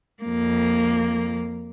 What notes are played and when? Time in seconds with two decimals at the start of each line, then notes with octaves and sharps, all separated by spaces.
0.23 F2 A#3